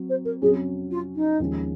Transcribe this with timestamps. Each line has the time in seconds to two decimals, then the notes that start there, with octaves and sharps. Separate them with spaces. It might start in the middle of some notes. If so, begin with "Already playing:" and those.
Already playing: F#3 C4
0.09 C5
0.25 A#4
0.42 F2 C3 F#3 C#4 G#4
0.91 F4
1.15 D#4
1.40 D#2 C#3 F3 G#3 C#4